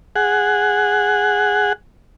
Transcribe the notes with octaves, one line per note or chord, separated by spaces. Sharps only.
G#4 F#5